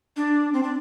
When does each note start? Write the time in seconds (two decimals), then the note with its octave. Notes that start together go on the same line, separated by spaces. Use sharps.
0.17 D4
0.54 C4
0.63 D4